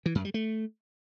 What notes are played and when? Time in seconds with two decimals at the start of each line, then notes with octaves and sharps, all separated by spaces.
0.06 E3
0.15 F#2
0.25 G3
0.34 A3